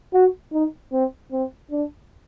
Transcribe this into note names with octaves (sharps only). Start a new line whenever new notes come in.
F#4
D#4
C4
C4
D4